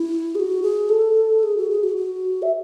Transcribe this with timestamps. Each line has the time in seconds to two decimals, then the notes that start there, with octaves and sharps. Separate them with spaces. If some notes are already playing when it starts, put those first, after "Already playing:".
Already playing: E4
0.35 G#4
0.40 F#4
0.63 G#4
0.89 A4
1.43 G#4
1.57 F#4
1.70 G#4
1.83 F#4
1.97 F#4
2.42 E5